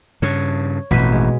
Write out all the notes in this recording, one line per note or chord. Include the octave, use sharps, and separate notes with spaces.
G2 C#3 C#5
A1 F2 B2 B6 D#7
G#3